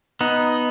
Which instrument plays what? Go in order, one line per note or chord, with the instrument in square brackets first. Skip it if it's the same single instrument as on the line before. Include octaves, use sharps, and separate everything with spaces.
[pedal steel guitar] B3 D#4